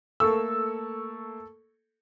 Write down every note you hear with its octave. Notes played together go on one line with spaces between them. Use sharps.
A3 A#3 A4 C#6 E6